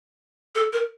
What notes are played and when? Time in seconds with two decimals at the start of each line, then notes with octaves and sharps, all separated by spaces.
0.55 A4
0.73 A#4